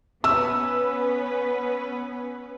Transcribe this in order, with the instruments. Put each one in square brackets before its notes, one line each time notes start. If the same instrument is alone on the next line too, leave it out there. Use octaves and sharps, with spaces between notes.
[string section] B3 C#4 B4 [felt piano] E6